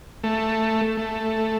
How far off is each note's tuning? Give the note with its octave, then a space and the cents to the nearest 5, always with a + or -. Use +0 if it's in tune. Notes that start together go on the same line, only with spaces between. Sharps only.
A3 +10
A3 +5